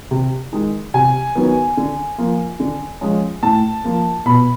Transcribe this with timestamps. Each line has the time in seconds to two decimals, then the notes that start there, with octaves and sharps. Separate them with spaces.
0.11 C3
0.53 D#3 G#3
0.94 C3 G#5
1.35 D#3 F#3 B3
1.77 D3
2.18 F3 A#3
2.60 D3
3.01 F3 G#3 C#4
3.43 A2 A5
3.84 F3 A#3
4.26 B2 B5